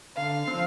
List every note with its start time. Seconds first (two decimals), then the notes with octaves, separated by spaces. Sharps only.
0.16 D3 F5
0.48 F3 C4